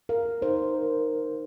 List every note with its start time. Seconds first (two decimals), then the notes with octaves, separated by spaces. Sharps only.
0.09 A#4 F5
0.41 D#4 C5
0.74 A#4